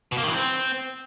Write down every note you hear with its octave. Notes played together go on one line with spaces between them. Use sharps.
B2
A#3
D#3
E3
C4